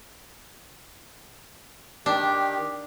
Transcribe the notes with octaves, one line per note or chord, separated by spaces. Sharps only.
D#3 D4 G4